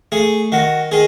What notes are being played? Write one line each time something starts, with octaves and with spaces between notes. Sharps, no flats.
A3 G#4
D#3 F#4
D#3 G#4